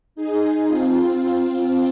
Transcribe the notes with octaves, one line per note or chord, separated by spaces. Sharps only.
D#4 G#4
C4 F4